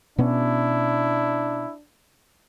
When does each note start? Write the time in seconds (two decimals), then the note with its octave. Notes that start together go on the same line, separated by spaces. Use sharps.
0.18 B2 B3 C#4 D4 E4